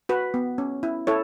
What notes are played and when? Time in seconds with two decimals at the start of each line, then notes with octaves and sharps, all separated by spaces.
0.09 F#4 B4
0.34 B3
0.58 C#4
0.83 E4
1.07 E4 A4 C#5